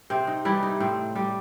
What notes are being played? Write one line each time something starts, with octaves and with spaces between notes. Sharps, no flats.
C3 C4
D#4
E3 G3 E4
D#4
A2 C4
G3